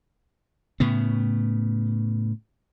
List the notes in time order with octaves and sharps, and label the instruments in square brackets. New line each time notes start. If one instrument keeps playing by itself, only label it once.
[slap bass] A2 C#3 B3